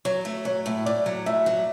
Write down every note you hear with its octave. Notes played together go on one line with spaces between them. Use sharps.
F#3 C#5
A3
F#3 C#5
A2
A2 D5
F#3
A2 E5
F#3